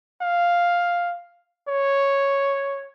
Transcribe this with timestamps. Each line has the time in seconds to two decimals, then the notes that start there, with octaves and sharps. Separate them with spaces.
0.21 F5
1.68 C#5